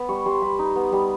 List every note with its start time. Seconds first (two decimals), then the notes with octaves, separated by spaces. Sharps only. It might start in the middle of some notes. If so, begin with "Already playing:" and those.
Already playing: B3 B5
0.09 G3 C#6
0.26 G3 C6
0.42 G3 B5
0.59 D#4
0.76 B3
0.92 G3